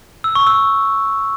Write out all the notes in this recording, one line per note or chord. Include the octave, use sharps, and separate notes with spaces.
E6
C#6
E6